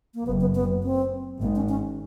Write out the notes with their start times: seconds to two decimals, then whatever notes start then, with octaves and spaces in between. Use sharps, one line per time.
0.14 A#3
0.26 F#1 F#2 B3
0.41 B3
0.55 B3
0.83 C4
1.40 G#1 G#2 A#3
1.55 C#4
1.69 C#4